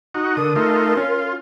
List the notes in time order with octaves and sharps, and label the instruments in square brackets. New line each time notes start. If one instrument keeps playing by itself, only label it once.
[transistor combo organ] D#4 F#4
[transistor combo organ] D3 D#6 [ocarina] A#4
[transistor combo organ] A3 D#4 F4
[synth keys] C#4 [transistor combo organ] F4